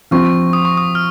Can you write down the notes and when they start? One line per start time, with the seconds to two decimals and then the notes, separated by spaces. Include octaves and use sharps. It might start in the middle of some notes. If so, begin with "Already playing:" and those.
0.11 F3 C4 F4 C#6
0.53 D#6
0.65 C#6
0.77 D#6
0.95 F6